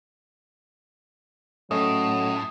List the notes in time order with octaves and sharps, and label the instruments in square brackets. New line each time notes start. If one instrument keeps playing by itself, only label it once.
[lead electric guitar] A2 [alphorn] F#3 [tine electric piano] A3 C#4 D#5 [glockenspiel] D#6